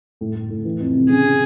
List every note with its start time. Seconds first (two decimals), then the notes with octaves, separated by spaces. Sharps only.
0.21 A2
0.35 A2
0.50 A2
0.65 E3
0.80 F2
0.94 C3
1.09 C#3 G#4
1.25 C#3